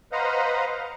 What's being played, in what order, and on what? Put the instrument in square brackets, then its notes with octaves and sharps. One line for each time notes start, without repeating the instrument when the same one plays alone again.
[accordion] B4 C5 D#5 F5 F#5 A#5